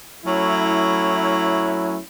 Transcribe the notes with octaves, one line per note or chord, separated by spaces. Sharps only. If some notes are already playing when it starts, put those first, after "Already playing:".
F#3 A3 C#4 E4